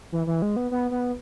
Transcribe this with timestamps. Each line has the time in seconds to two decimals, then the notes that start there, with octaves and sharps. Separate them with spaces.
0.12 E3
0.27 E3
0.42 G#3
0.56 B3
0.71 B3
0.91 B3